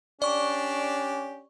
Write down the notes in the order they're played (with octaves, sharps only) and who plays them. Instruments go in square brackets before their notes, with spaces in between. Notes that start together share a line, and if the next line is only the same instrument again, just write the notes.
[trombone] C#4 [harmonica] D4 G4 [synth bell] D5 C#6